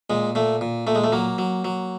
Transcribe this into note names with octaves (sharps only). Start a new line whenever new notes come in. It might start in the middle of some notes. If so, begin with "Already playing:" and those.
A#2 G#3
A#2 A3
A#2
A#2 A3
G#3
A3
F#3 A#3
F#3
F#3